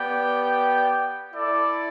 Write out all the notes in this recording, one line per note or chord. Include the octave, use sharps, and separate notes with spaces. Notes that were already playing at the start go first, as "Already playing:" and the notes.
Already playing: B3 G4 D5 G5
E4 A4 D5